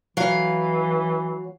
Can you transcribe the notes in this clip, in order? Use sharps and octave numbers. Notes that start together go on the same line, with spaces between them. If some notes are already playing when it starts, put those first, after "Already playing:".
E3 F#3 F5